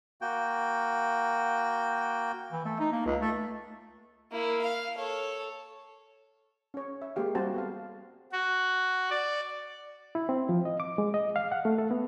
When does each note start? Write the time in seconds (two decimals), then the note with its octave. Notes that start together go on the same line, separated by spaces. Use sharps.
0.21 A#3 F#4 G5
2.52 E3
2.65 A3
2.80 D#4
2.92 A#3
3.05 C#2
3.21 A3
4.32 A#3 E4
4.62 F5
4.95 A4 C#5
6.74 C#4 C#5
7.02 E5
7.16 G#3 A#3 G4 F5
7.35 G3 C4 F#4 C5 A5
7.54 B3 A4 F5
8.32 F#4
9.10 D5
10.15 E4
10.29 C4
10.49 F3
10.65 D#5
10.80 D6
10.98 G#3
11.14 D#5
11.36 F5
11.52 F#5
11.65 A3
11.78 A4
11.91 B3